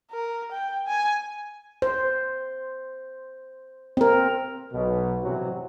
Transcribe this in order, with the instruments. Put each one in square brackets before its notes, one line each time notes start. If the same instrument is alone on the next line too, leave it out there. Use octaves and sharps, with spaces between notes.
[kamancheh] A#4
G5
G#5
[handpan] C5
C4 A#4
[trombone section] B1 B2
A1 F2 C3 E3 F#3 F#4